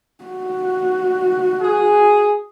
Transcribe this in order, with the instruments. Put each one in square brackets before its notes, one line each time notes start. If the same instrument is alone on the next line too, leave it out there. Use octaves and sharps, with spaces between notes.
[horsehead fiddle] F#4
[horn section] G#4